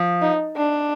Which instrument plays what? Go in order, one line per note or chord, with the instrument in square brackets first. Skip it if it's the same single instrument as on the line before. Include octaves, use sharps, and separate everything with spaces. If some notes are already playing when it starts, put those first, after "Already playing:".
Already playing: [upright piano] F3
[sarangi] D#4
D4